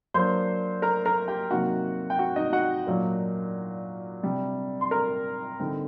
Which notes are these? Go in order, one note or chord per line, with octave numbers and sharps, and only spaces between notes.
F#3 A#3 D4 C5 C6
A#4 A#5
A#4 A#5
G4 G5
C3 F#3 A#3 D#4 F#4 F#5
G5
F#4 F#5
D#4 D#5
F#4 F#5
A#2 F#3 A#3 D4
C3 G3 D4
C6
A#4 A#5
D3 G3 C4 D#4